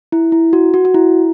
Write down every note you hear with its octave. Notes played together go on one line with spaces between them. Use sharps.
E4
E4
F#4
F#4
F#4
E4